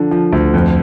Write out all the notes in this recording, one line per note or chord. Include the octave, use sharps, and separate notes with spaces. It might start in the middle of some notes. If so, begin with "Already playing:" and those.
Already playing: D3 F3
F3
D2
F2